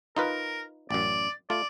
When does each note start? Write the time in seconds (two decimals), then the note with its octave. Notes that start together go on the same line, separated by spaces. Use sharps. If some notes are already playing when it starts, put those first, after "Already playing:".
0.17 D#4 F4 A#4 B4
0.91 A1 F#2 D5
1.50 A3 F4 D5